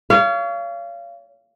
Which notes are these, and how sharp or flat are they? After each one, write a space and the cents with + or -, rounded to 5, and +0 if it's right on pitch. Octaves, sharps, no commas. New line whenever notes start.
C#5 +35 F5 -25